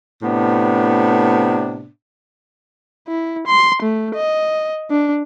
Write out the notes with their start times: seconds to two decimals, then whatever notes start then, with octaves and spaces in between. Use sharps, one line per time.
0.22 A2 C3 B3 D4
3.08 E4
3.47 C6
3.82 A3
4.15 D#5
4.91 D4